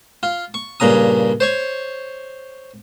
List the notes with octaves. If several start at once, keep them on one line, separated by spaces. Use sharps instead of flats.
F4
C#6
G2 A#2 C#3 A#5 D#6
C5 C#5 C#6